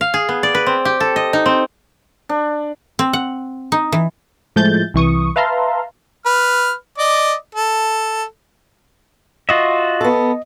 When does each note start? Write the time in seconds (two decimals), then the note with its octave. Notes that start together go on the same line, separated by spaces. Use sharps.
0.01 F5
0.14 G#4
0.29 B3
0.43 D5
0.55 B4
0.66 C4
0.85 G4
1.00 A4
1.16 D#5
1.33 D#4
1.46 C4
2.29 D4
2.99 C4
3.13 F#5
3.72 D#4
3.92 E3
4.56 A2 F3 G#3 A3 G6 A6
4.94 C2 E3 C#6 D#6
5.36 B4 E5 F5 A5 A#5 C6
6.26 B4 F6
6.98 D5 D#5 D6
7.55 A4
9.49 F4 F#4 D#5 E5
10.01 B3 A4